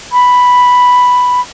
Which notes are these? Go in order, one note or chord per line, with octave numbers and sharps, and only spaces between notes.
B5